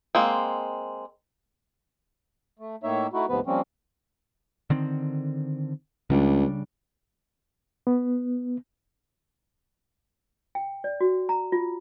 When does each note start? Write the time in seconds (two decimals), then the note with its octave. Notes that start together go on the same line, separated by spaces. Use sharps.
0.15 G#3 A#3 C4
2.59 A3
2.83 A2 A#3 D#4 C#5 E5
3.13 A3 D#4 E4 F#4
3.29 D2 G#2 C3 F3 B3 B4
3.46 F3 G3 A#3 C4 C#4
4.70 D3 D#3 C4
6.10 C#2 C#3 G3 D4
7.87 B3
10.55 G5
10.84 D5
11.01 F#4
11.29 A#5
11.52 F4